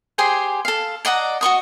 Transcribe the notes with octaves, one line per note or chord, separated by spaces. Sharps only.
G4 G#4 C5 G#5
A4 F5
D5 D#5 F#5 A#5
F#4 D#5 C#6 D#6